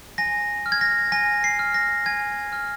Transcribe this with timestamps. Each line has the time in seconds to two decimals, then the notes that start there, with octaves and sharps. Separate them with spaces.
0.18 G#5 A#6
0.66 F6
0.72 G#6
0.81 A#6
1.12 G#5 A#6
1.44 C7
1.59 F6
1.74 A#6
2.06 G#5 G#6
2.53 F6